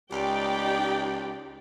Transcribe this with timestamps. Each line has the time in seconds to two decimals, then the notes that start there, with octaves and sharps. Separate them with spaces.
0.12 C#2 D#4 G4 D5 G5